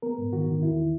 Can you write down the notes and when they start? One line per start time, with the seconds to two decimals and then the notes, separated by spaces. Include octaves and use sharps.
0.02 B3 A#4
0.18 G#2
0.33 D#3 F#4
0.48 D#3
0.63 E2 E4